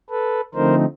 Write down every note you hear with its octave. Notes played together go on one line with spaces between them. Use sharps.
A4 B4
D3 F3 A3 C4 D#4 A#4 C5